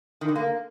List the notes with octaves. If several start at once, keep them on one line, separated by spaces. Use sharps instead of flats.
D#3
D3
A#3